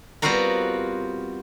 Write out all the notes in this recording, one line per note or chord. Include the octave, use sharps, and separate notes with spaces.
G3 B3 C4 F4 F#4 A#4